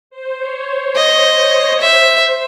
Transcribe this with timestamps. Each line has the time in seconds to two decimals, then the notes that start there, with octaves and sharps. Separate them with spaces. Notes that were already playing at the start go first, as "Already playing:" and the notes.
0.10 C5
0.38 C#5
0.67 C5
0.95 C#5 D#5
1.81 C5 E5